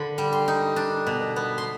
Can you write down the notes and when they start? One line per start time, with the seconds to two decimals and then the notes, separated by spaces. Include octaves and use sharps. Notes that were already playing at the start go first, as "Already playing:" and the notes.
Already playing: D3 B5
0.18 G3
0.33 C6
0.48 D#4
0.76 D4
1.07 B2
1.36 B3
1.58 C6